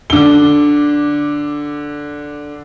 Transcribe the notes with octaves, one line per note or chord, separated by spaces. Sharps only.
D3 G7